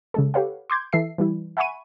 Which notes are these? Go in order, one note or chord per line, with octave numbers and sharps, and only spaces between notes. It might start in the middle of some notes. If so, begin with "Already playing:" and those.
C#3 G#3 A4
G4 A4 B4 C#5 F5 F#5
C6 D6 G6 G#6
E3 A4 E5 C7
E3 G3 E4
E5 F#5 G#5 B5 C#6 D#7